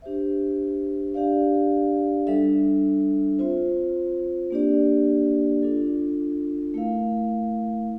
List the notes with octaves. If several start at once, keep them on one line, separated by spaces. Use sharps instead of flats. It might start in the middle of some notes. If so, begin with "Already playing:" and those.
D4 G4 C5 E5
D4 G4 D5 F5
G3 D4 A4 E5
C4 F4 C5
A#3 D4 G4 D5
D4 F4 A4
A3 E4 A#4 F5